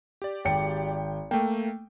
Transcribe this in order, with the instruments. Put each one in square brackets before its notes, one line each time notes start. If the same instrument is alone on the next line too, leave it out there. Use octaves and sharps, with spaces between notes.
[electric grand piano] G4 D5
[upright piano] G#1 G5 C#7
[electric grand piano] A3 A#3 [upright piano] G5